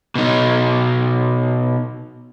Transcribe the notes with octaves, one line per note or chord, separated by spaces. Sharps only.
B2 D#4